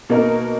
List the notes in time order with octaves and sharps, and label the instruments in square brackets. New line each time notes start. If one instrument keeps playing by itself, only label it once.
[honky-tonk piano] B2 A#3 D#4 A#4